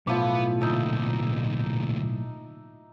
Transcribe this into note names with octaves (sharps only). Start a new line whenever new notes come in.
B1 A2 F3 B3 E4 D6
D2 A#2 D#4 E5 A5